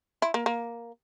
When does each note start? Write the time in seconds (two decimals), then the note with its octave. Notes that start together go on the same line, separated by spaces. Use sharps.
0.22 E4
0.34 A#3
0.46 A#3